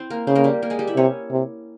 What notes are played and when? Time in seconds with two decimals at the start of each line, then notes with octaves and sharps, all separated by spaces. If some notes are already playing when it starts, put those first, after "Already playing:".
Already playing: C4 E4 C5
0.10 A#3 A#4
0.27 C#3 C4 C5
0.35 A#3 A#4
0.44 G3 G4
0.62 A#3 A#4
0.70 G#3 G#4
0.79 G3 G4
0.87 E4 E5
0.96 C3 C#4 C#5
1.31 C3